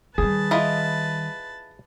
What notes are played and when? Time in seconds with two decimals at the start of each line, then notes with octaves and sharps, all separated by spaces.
0.18 D#3 G3 G#4 B4 A5
0.51 E4 F4 D#5